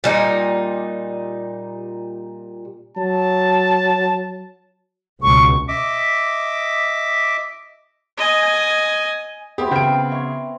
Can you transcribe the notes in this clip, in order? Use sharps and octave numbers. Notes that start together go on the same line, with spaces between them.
A#2 G3 D#4
F#3 A5
C#2 B2 C#6
D#5 E5 D6
D#5 G#5
B3 C4 G4 G#4 E5
C#3 C5 E5 G5 D7
C#5 E5 C6